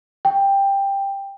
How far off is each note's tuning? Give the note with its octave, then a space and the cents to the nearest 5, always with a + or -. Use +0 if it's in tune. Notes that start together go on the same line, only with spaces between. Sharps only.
G5 +10